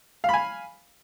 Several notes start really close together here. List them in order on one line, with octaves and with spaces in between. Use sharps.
F5 B5 G#5